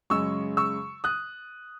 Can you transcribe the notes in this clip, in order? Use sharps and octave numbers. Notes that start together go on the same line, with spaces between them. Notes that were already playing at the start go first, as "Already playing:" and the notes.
F#2 C#3 G#3 C#6 E6
C#6 E6
D#6 F#6